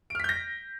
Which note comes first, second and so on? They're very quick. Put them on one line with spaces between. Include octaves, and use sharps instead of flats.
D7 F6 B6 G6 A#6